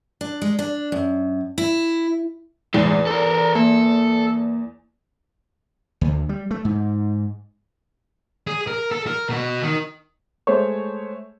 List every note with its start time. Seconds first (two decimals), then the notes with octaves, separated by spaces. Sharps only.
0.21 D4
0.42 G#3
0.59 D4
0.92 F#2
1.58 E4
2.74 E2 A2 G#3
3.07 A4 A#4
3.55 A#3 A4
6.01 D2
6.29 G3
6.51 A3
6.65 G#2
8.47 G#4
8.67 A#4
8.92 A4
9.07 A#4
9.29 B2 F#4
9.62 D#3
10.47 G#3 A3 C5 C#5